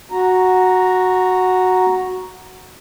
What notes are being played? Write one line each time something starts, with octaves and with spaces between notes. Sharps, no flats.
F#4 A#5